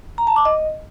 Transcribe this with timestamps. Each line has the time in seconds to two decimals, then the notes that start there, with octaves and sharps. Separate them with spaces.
0.18 A#5
0.27 A5
0.36 D6
0.45 D#5